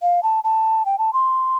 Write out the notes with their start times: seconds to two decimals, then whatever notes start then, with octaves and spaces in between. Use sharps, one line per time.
0.02 F5
0.23 A5
0.44 A5
0.86 G5
0.98 A5
1.13 C6